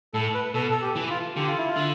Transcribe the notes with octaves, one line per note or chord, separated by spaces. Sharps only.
A2 A4
B4
B2 A4
A4
G4
E3
F4
D3 G4
F4
E4
F4
D3